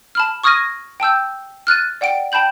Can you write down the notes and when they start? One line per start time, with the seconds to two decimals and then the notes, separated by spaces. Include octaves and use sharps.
0.15 A5 B5 F6
0.44 C#6 D#6 F6 G#6 A#6 D#7
1.00 G5 A5 E6 G6
1.67 F6 F#6 A6 D#7
2.01 D5 F#5 G5 D7
2.32 G5 A5 B5 G6 F#7